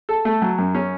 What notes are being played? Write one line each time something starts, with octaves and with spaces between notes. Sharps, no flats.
A4
A3
F#3
F#2
C#4